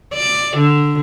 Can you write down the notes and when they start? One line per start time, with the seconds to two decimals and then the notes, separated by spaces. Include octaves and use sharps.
0.13 D5
0.56 D3